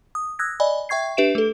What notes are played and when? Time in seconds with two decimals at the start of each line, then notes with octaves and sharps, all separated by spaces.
0.15 D#6
0.39 D#6 E6 F#6 G#6 A#6
0.60 D5 D#5 G#5 B5
0.89 E5 G5 C#6 G#6 C7
1.17 D4 G4 B4 E5 D7 E7
1.35 A3 A4